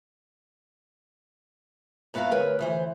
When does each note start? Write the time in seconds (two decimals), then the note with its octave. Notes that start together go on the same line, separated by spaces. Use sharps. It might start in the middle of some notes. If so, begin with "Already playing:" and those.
2.14 G2 B3 E4 G#4 F5 A#5
2.31 D2 A#4 B4 C#5
2.59 D2 E3 C5